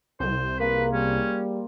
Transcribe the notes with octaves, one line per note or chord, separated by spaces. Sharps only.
C2 C5
A#3 F4 G#4 A#4 B4
G3 C#4